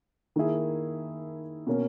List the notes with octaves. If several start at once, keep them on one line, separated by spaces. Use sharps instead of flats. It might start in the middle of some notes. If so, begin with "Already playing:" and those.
D#3 A#3 E4 G#4
B2 A#3 C#4